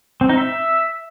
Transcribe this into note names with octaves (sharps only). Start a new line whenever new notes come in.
C4
D#4
E5